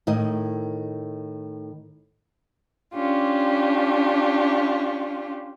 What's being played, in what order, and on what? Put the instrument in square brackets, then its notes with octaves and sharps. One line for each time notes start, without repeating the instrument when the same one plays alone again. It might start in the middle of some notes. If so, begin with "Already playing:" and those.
[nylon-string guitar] A2 D#3 E4 D#5
[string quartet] C#4 D4 F4 G4